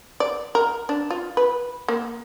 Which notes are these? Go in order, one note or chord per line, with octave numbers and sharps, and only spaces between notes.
D5
A#4
D4
F4
B4
A#3